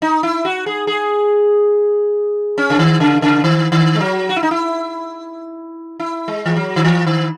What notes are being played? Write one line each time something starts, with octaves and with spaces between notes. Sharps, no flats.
D#4
E4
F#4
G#4
G#4
C#4
C#3
D#3
C#3
C#3
D#3
D#3
G#3
F#3
F#4
E4
D#4
E4
E4
G#3
E3
F#3
D#3
E3
D#3